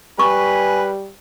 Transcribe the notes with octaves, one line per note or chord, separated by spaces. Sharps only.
G3 B4 G#5 C#6